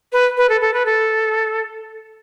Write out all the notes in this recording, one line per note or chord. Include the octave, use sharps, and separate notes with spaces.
B4
B4
A4
A4
B4
A4